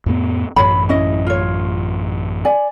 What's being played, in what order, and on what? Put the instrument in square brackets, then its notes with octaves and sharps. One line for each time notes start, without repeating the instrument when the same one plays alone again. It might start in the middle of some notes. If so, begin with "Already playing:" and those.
[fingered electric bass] F2 A2 B3
[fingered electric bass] A1 F#2 [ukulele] C#5 B5
[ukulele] C#4 E4 D#5
F4 C#5
D5 G#5